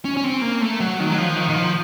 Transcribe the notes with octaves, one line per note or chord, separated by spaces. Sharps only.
C#4
C#4
C4
A#3
A3
F#3
D#3
F#3
F3
D#3
D#3
F3